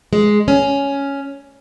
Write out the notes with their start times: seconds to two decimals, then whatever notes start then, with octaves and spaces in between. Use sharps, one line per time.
0.13 G#3
0.48 C#4